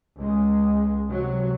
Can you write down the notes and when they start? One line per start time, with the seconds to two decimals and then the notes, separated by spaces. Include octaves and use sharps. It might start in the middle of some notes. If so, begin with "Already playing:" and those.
0.18 C#2 G#3
1.06 C3 F#3